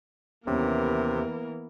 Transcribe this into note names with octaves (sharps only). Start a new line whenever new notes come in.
D#2 C3 E3 A#3 B3 C#4 A#4